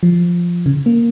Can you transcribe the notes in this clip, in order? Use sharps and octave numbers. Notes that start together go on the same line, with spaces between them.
F3
C#3
A#3